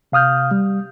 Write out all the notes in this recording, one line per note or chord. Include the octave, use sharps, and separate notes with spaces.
C3 F5 D#6 F6 G6
G3